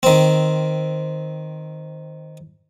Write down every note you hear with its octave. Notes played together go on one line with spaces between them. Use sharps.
D#3 C4